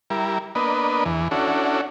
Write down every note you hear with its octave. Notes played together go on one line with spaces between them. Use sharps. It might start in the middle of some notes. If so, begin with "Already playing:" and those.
G3 E4 A#4
A#3 B3 D4 B4 D#5
E2 E3
C#4 D4 E4 F#4 A4